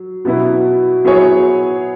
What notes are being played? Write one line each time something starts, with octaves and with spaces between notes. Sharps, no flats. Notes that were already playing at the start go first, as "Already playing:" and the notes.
Already playing: F#3
B2 F#3 B3 E4
F#3 B3 E4 G#4 C#5